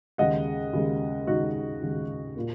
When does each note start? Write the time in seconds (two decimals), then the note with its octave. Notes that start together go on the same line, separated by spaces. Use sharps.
0.18 D#2 C#3 G#3 D#5 F#5
0.73 D#2 C#3 G#3
1.27 D#2 C#3 G#3 D#4 F#4
1.81 D#2 C#3 G#3
2.35 A#2 A#3